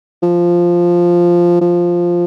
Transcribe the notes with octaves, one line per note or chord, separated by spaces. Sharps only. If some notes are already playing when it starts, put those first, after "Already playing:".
F3
F3